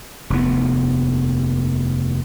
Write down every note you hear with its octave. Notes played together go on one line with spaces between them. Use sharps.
F1 D#2 B3